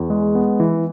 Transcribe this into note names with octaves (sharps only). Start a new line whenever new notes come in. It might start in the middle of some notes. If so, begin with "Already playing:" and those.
Already playing: E2
G#3
B3
E3